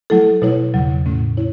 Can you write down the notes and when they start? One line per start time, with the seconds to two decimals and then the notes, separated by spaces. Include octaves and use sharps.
0.10 F#3 A3 E4 A4
0.42 B2 F#3 A3 E4 C#5
0.74 E2 C#3 F#3
1.06 A2 A3 C#4
1.37 E4 C#5